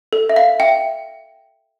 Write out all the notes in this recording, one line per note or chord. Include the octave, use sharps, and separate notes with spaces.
A4
E5
F5
E5 G5